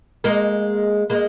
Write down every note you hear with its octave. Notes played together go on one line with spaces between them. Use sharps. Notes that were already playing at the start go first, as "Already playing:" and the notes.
G#3 A#3
G#3 A#3